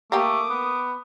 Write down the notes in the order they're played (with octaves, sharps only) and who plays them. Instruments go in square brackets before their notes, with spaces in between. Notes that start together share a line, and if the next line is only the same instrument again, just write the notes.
[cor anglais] A3 [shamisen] A#3 G4 [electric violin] D6 D#6
[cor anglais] B3